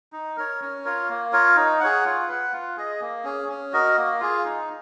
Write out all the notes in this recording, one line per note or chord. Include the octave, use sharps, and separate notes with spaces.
D#4
A#4 C#5
C#4
F4 A#4 C#5
A#3
F4 A#4 C#5
D#4
G#4 C#5 F#5
F4
B4 F#5
F4
G#4 D#5
A#3
C#4 G#4
C#4
F#4 A#4 D#5
A#3
F4 G#4
D#4